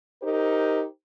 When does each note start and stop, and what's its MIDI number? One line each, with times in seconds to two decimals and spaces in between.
0.22 0.83 63
0.22 0.83 67
0.22 0.83 70
0.22 0.83 72